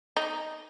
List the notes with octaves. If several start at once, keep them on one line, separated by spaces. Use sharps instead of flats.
D#4